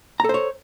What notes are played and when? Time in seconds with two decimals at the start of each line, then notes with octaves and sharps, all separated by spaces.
0.20 A#5
0.25 A4
0.29 C5
0.34 C#5